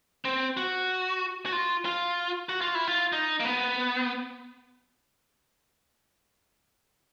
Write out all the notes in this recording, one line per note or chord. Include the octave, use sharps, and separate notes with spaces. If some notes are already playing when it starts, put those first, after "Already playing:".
C4
F#4
F#4
F4
F4
F#4
F4
E4
F4
D#4
A#3
B3